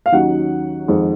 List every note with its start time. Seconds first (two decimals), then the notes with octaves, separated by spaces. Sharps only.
0.06 F5
0.12 D#2 D#3 F#3 C#4 F#5
0.88 F2 D#3 G#3